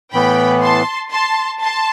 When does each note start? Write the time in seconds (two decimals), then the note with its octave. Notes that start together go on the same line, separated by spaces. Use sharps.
0.12 A2 E3 B3 G5 B5
0.62 A5 C6
1.12 A5 C6
1.62 A5 C6